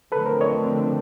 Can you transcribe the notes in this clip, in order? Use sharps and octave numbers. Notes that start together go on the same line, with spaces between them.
D3 F3 A3 C4 A4 B4
A#4 C5
C#5 D#5